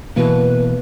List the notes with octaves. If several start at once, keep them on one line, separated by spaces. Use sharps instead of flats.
B2 E3 A#3 B4